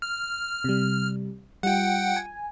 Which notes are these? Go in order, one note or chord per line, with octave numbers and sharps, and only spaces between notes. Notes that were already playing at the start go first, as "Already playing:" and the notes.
F6
C3 G3
G3 F4 F#5 G5
G#5